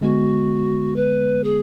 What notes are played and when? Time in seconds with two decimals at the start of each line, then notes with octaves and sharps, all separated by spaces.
0.01 D3 G#3 B3 F#4
0.96 B4
1.44 G#4